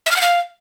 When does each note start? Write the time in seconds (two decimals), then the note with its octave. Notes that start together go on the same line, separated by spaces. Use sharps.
0.06 E5
0.11 F6
0.16 F#5
0.21 F5